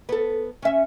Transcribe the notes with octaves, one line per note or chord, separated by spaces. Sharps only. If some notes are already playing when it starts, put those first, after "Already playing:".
B3 A4
C#4 E5